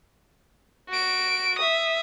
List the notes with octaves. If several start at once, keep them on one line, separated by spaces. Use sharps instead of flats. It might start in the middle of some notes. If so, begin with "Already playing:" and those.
F#4 D7
E5 D#6